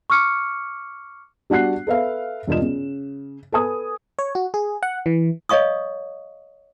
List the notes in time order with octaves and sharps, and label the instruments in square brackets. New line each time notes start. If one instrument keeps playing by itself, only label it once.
[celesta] C#6 D6 F6 C#7
[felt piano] G3 D4 F#4 F#5 F#6 C7
A4 B4 E5 F5
E1 G2 F4 D#5 E7
C#3
A4 B4 G#5 D#6
[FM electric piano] C#5
F#4
G#4
F#5
E3
[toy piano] C#5 D#5 F5 C#6 D#6